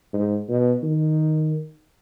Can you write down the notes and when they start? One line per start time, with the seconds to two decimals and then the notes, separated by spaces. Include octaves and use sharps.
0.13 G#2
0.49 B2
0.83 D#3